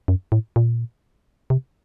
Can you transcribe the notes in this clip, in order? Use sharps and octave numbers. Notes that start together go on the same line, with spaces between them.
F#2
A2
A#2
C3